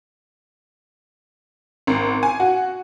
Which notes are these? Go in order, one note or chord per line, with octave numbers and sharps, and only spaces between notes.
G#1
G#5
F#4